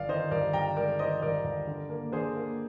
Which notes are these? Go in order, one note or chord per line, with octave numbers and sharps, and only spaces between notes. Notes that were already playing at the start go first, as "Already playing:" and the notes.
Already playing: G1 D5 F5
D#3 C5 D#5
G2 A#4 D5
G2 G5 A#5
G#3 A#4 D5
D#3 C5 D#5
G2 A#4 D5
G2
D3
A#3
D3 G#4 C5
A#3